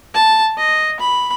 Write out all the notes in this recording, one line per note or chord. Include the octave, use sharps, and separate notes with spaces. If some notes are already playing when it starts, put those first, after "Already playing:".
A5
D#5
B5